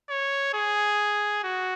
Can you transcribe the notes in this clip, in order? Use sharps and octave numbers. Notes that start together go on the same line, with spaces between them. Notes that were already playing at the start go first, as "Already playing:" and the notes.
C#5
G#4
F#4